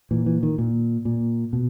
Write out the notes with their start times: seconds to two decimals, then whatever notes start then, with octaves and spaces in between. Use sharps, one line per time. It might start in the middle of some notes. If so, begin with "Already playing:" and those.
0.11 A#2 E3
0.26 E3
0.43 D#3
0.58 A#2
1.05 A#2
1.53 B2